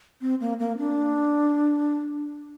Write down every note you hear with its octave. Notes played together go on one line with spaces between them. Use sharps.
C4
A#3
A#3
D4